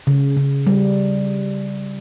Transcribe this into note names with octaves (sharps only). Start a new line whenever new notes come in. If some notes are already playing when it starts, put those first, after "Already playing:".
C#3
C#3
G3